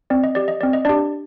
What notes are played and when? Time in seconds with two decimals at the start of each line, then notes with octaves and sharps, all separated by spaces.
0.10 C4 D5
0.24 D#5
0.35 G4 D5
0.48 D#5
0.61 C4 D5
0.73 D#5
0.85 D4 G4 D5